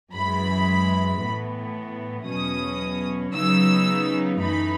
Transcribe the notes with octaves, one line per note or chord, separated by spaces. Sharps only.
F#2 E3 G#3 B5
A2 E3 B3
E2 B2 F#3 C#4 D#6
C#3 F#3 B3 D#4 E6
F#2 E3 A3 D#4 B5